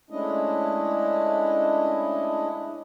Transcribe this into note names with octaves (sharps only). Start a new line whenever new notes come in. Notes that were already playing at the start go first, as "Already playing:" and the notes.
G#3 A3 C#4 D4 E4 D#5